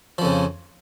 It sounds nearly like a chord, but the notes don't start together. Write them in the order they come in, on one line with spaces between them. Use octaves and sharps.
F3 F2 C#3